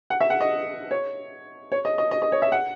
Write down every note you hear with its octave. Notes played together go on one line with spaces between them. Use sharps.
F#5
E5
F#5
D#5
C#5
C#5
D#5
D#5
D#5
D#5
C#5
E5
F#5